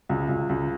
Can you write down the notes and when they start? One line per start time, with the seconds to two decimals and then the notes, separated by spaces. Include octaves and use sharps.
0.09 C#2
0.29 C#2
0.49 C#2